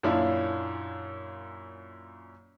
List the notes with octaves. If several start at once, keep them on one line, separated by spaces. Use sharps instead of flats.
F#2 A#2 C#4 D4 E4 F4